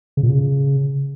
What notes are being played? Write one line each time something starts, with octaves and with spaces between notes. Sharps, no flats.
C#3
A#2
C#3